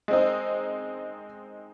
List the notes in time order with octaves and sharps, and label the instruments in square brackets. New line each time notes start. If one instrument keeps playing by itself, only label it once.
[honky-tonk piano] G#3 C4 D#4